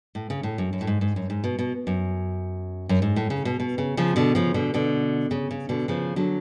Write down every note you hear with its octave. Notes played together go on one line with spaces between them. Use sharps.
A2
C#3
A2
F#2
F#2
A2
G#2
G#2
F#2
G#2
B2
B2
F#2
F#2
G#2
A2
C#3
B2
B2
C#3
C#3 F3
B2 D3
C#3 F3
B2 D3
B2 D3
C#3
C#3
B2 D3
C#3 F3
D3 F#3